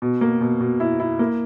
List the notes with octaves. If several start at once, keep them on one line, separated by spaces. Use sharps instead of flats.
B2
A#3
B2
B2
E4
E4
A#3